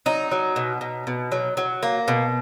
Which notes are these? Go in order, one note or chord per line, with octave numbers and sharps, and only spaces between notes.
F#3 D#4
F#3
B2
B2
B2
F#3
F#3
A#3
B2